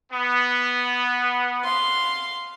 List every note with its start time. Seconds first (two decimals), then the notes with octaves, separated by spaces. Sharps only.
0.12 B3
1.64 F5 C6